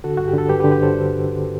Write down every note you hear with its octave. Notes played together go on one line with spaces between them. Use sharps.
D3 F#4 A4
G2 F#4
G4
D3 A4
G2 G4 B4
G4 B4
D3
G4 B4
G2 A4 C5
D3
G2
D3